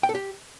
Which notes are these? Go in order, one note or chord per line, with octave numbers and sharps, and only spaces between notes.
G5
A4
G4